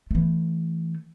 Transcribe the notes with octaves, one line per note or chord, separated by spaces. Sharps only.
E3 A3